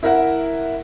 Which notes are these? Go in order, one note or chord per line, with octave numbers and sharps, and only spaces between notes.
E4 A#4 E5 F#5